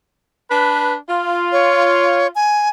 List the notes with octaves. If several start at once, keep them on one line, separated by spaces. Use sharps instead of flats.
D4 B4
F4
C#5
G#5